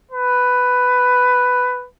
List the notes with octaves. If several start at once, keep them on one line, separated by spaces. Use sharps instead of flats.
B4